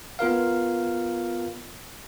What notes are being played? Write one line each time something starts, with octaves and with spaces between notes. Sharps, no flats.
B3 F4 A#4 F5